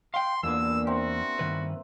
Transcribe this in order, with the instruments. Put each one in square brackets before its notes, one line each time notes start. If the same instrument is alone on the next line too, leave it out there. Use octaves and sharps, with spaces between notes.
[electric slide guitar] F5 G5 [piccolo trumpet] C6
[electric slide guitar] E2 A#3 [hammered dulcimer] A#2 D3 B3 [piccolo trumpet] E6
[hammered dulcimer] C4 E5 A#5 [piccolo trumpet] F#4
[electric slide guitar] G2 D#3 B4